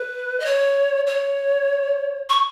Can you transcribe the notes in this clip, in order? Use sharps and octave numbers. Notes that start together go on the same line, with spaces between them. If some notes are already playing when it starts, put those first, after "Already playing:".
Already playing: B4
D#5
C#5
C#5
C#6